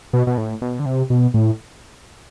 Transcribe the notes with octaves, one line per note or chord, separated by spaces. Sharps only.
B2
B2
A2
B2
D3
C3
B2
A2